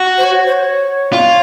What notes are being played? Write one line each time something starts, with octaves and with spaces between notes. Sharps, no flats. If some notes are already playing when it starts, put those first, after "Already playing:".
Already playing: F#4
C5
C#5
C5
C#5
F4